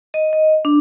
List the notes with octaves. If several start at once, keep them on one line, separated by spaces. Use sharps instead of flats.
D#5
D#5
D4